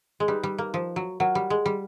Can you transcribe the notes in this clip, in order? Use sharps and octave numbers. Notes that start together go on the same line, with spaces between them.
G#3
G3 D#4 G4 B4 D5
G3
A#3
F3
F#3
F#3 F4 A#4 C#5 F#5
G3
G#3
G3